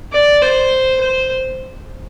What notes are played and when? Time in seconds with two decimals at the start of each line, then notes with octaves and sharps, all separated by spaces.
0.13 D5
0.42 C5
1.01 C5